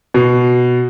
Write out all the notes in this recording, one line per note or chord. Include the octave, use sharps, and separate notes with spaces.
B2